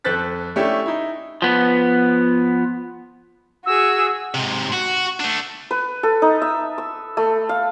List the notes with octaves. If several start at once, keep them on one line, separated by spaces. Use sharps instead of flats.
F2 A4 C5 F#6 A6 B6
A3 C#4 D4 E4 G4
D#4 E4
F3 B3
F#4 G#4 E6
G#2 C3
F#4
A3 D4
B4
A4
D#4
E5
E6
A3
F5